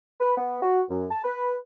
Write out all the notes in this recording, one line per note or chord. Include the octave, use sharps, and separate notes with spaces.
B4
B3
F#4
F#2
A5
B4